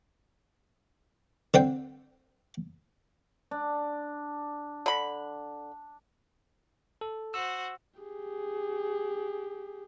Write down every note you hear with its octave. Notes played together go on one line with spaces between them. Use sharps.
D3 C4 G5
D4
D3 B5
A4
F#4 C5 E6
G4 G#4